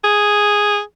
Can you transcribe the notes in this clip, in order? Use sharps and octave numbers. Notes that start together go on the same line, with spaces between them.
G#4